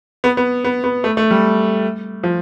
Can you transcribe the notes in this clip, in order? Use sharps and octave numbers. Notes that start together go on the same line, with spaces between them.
B3
B3
B3
B3
A3
A3
G3
F3